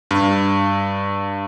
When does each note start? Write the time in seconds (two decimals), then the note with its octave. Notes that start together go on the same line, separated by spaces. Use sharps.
0.11 G2